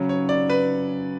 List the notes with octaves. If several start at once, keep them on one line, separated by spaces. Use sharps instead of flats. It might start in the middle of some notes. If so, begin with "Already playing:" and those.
Already playing: C#3 F#3 C#4
C#5
D5
B4